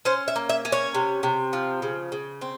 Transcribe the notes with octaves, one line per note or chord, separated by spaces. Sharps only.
C#4 C5
E5
A#3
E5
C#4
C#5
C3
C3
F3
C#3
C#3
C4